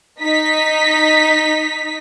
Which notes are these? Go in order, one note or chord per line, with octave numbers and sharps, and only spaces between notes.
D#4 B6